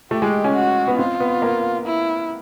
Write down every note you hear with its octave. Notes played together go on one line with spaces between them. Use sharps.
A3 G4
G#3
C#4
F#4
B3
C4 F4
B3
A#3
E4